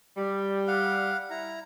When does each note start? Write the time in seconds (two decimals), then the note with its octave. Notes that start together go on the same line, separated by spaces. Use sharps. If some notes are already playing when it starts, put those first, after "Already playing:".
0.18 G3
0.67 F5 F#5
1.30 E4 A#5